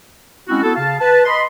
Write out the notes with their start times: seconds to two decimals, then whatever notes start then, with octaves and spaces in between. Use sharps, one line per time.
0.48 G#3 C4 C#4 E4 F#4
0.63 B3 E4 F#4 A4
0.76 C#3 F5 A5
1.00 B4 A5
1.25 D#5 B5 C6